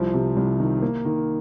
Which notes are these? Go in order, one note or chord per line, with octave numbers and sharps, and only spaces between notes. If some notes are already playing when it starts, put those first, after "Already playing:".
Already playing: C2 F3
C3
C2
D#3
A#3
D#3